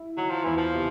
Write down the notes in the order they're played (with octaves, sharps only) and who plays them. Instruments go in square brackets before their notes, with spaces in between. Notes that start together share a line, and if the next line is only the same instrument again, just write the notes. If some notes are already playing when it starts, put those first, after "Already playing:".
Already playing: [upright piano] E4
[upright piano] D#3 [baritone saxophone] F#3
[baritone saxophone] F3
[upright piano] E2 [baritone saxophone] E3
[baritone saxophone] F3
[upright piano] C3